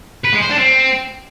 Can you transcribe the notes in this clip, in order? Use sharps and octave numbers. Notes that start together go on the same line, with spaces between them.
B4
G#3
C5
D4
C4